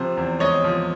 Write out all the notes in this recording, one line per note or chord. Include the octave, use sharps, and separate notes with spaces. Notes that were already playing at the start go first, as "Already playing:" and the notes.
Already playing: C3 F3 C5
E2
G#3 C#5 D#5
F3